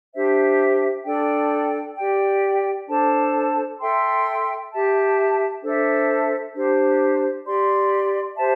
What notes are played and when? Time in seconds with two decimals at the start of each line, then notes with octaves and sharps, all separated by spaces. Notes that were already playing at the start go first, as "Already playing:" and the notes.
0.14 D4 G4 C5 E5
1.06 D4 A4 D5 G5
1.97 G4 D5 G5
2.88 D4 A4 C5 A5
3.80 A4 E5 G5 C6
4.72 G4 E5 A5
5.63 D4 A4 C5 E5
6.54 D4 G4 C5
7.46 G4 D5 C6
8.37 G4 C5 E5 A5